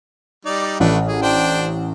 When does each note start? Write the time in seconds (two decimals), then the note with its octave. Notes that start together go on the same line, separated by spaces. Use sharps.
0.45 G3 D#4 D5
0.80 A1 A3 D4 B4
1.07 G#4
1.22 D4 C5 G5